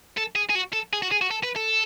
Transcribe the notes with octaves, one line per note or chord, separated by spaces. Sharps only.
A4
G#4
G#4
F#4
A4
G#4
F#4
G#4
F#4
A4
B4
A4